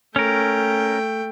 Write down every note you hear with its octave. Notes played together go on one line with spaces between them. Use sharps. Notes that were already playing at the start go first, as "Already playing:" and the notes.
A3 C#4 A#4 G5